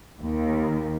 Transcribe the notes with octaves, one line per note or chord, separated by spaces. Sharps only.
D#2